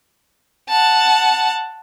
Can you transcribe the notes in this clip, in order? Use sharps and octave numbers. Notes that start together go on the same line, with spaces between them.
F#5 A5